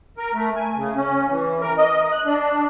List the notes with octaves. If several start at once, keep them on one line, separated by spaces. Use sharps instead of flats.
A#4
A3
G#5
C#3
C#4
E3
A#4
D#5
F#6
D4